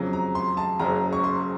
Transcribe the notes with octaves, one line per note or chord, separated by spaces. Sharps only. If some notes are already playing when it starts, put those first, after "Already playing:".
Already playing: F2 C#3 F#3
A#5
C6
A5
F#1 F#2 C#3 F#3 A#5
C#6
C6